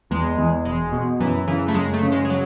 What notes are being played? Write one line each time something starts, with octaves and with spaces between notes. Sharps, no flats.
E2 G#3
E2
E1 G#3
B2
F#2 E3
C#3 E3
A3
F#2 G#3
A3
C#3
G#3
G#3
F#3